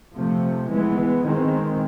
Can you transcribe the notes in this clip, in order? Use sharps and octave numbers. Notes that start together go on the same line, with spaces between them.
C3 F3 A3
E3 G#3 B3
D#3 G#3 C4